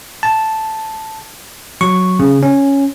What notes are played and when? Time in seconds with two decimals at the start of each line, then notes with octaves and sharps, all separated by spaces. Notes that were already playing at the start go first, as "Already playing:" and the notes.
0.23 A5
1.81 F#3 C#6
2.19 C#3
2.43 C#4